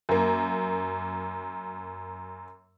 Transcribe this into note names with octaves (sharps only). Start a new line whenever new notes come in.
F#2 A#3